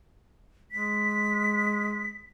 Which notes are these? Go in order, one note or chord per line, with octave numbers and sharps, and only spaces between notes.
G#3 B6